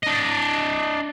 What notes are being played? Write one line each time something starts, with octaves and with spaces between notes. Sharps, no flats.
D4 D#5